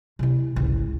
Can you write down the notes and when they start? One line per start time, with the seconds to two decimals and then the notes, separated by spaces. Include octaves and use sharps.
0.19 C3 E4
0.56 G#1 C#2